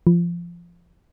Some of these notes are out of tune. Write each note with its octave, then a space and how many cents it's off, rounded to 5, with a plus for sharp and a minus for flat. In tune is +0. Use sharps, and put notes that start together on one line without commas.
F3 -20